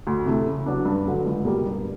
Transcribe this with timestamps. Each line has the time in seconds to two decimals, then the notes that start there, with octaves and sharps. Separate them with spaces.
0.07 D2
0.26 C3 E3 A3
0.47 C#3
0.66 F#3 B3 D4
0.85 G2
1.06 D3 F#3 A3
1.26 C#2
1.45 B2 G3 A#3
1.66 G2